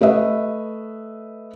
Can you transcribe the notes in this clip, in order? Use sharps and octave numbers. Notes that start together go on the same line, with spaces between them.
A3 B4 D#5 E5